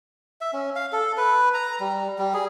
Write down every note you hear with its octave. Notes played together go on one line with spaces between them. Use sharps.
E5
C#4
F5
A4
B4
A#5
G3
G3
G#4